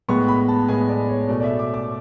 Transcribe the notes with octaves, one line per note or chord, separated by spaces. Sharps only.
A2 G#3 B3 C#6
B5
A5
A2 G#3 B3 G#5
D5
C#5
B2 A3 D5
D5
E5
D6
D6